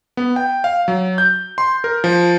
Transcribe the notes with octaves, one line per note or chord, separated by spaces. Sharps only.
B3
G5
F5
F#3
G6
C6
A#4
F3